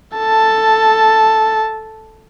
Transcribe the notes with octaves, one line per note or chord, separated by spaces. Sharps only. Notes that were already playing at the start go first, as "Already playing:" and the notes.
A4 A5